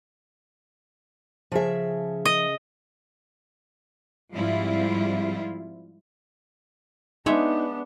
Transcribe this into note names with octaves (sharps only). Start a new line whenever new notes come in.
C#3 F3 G#4 E5
D#5
G#2 F3 G3 C4 E4 F4
G#3 B3 D4 D#4 C#5 E5